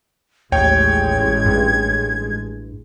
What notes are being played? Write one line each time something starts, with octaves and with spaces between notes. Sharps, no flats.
A1 D#2 G#3 C#5 G5 G#6
G2